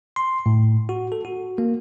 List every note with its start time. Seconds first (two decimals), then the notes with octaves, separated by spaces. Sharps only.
0.16 C6
0.46 A2
0.89 F#4
1.12 A4
1.25 F#4
1.58 A#3